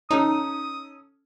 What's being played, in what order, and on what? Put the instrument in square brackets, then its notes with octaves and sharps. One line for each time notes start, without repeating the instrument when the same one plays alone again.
[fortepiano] C#4 A4 [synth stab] D#4 [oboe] D#6